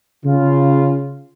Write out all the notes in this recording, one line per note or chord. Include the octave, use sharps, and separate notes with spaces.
C#3 F4